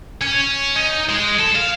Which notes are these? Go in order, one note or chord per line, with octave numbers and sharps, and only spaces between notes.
C#4
D#4
G#3
A4
F5